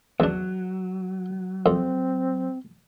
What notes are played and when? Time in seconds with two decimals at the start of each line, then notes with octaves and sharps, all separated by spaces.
0.20 E2 F#3 D4
1.66 F2 C4